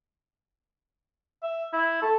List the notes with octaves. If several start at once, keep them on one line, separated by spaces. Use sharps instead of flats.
E5
E4
A4